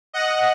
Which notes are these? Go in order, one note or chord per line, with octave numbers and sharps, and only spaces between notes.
D#5 F#5